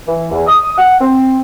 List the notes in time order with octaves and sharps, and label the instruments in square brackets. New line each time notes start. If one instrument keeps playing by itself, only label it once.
[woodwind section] E3
E2
D#6
F#5
C4